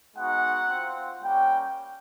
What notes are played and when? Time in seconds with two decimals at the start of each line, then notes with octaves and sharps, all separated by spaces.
0.16 G#3 B3 D#4 F#4 F#5
0.69 C4 F4
1.23 G3 A#3 C#4 G5